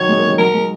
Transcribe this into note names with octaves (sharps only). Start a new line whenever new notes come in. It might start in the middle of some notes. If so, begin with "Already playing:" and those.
Already playing: D#3 F#3 C#5
G#3
A#3
D#3
F#3 A#4
G#3